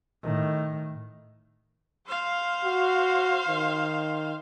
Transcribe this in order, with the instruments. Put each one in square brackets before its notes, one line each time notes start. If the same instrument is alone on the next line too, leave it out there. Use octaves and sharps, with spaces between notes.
[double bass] A2 D#3
[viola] C5 F5
[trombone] F#4
D#3